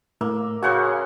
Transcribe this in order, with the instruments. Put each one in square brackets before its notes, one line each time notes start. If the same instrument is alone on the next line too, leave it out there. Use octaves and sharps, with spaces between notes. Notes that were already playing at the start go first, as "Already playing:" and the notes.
[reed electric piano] A2 [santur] A#3 E6
[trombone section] C#3 [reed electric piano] F#4 F5 C#6 [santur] C5 F#5 G#5